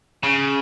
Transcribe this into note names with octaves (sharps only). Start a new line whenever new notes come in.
C#3